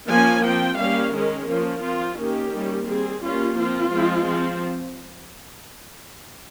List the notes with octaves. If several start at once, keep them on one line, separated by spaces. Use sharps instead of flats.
F3 A#3 C#4 G#5
F3 C4 G5
G3 A#3 C#4 F5
D#3 G#3 C#4 A#4
F3 A#3 C#4 A#4
F3 C4 F4
D#3 A#3 C#4 G4
D#3 G3 A#3 C#4
G3 C4 G#4
G3 A#3 C#4 F4
F3 C4 F4
F3 G#3 C4
F3 C4